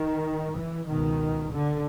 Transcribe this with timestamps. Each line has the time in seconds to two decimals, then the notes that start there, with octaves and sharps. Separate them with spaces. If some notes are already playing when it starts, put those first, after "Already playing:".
Already playing: D#3
0.56 E3
0.87 C#2 B2 D#3
1.50 D3